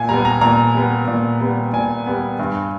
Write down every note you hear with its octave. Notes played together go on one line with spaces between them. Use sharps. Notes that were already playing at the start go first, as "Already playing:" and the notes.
Already playing: A#2 G#5
G3 B3 A#5
A#5
A#2 A#5
G3 B3
A#2
G3 B3
A#2 G#5
G3 B3
G2